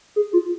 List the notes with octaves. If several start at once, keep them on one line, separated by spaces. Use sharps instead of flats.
G#4
F4